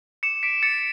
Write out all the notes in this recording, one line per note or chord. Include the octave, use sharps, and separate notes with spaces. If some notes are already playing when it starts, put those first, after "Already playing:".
D6 C#7 E7
D6 B6 D7
D6 A6 C#7